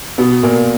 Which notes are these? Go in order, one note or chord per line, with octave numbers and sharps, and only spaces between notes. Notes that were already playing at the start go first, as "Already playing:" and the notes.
B2 B3
A#2 A#3